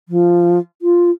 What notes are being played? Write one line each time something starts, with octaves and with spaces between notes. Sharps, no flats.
F3
F4